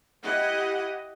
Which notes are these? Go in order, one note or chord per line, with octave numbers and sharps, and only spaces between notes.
E4 G4 D#5 F#5